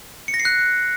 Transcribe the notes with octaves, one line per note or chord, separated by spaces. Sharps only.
C#7
A#6
C7
F#6